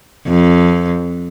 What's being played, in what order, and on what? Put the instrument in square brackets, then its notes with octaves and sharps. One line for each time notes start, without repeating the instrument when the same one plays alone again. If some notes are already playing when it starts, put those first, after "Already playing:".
[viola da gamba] F2